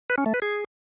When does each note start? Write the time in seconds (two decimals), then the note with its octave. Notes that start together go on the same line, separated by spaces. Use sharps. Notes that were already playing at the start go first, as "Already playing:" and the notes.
0.10 B4
0.18 C#4
0.26 A3
0.34 B4
0.42 G#4